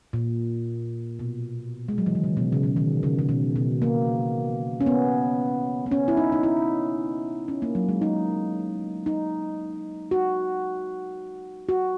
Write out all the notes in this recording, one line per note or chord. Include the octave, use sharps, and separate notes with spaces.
A#2
B2
G#3
F#3
E3
D#3
C#3
B2
C#3
B2
D#3
C#3
C#3
B2
B2
A#3
C#4
B3
B3
C#4
E4
D#4
D#4
E4
C#4
A#3
F#3
G#3
D#4
D#4
F#4
F#4